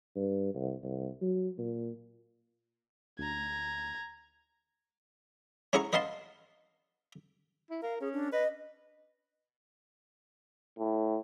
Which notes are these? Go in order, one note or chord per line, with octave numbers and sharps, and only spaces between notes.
G2
C2
C2
F#3
A#2
D2 A#5 G#6
C#4 E4 G#4 F#5 A#5 C#6
B4 D#5 F5 F#5 A5 C6
E4
A#4 F5
C#4 G#4
D4
B4 D#5
A2